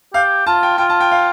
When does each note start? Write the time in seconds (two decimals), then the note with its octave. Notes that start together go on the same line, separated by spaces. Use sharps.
0.14 G4 F5
0.46 F4 A5
0.63 G5
0.78 F4 G5
0.90 A5
1.00 G5
1.12 F5